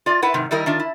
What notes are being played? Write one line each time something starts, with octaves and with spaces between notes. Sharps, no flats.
F4 D5
E4 B4 F#5
G#2 C3 D#3
D#3 G3 E4 A#4 D#5
D#3 D4 F4
E4